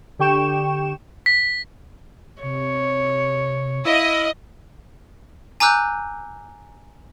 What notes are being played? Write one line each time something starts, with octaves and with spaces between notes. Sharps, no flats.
D3 G4 G5 C#6 E7
B6
C3 C#5
E4 D#5 F5
G#5 A#5 D6 E6 F#6 G6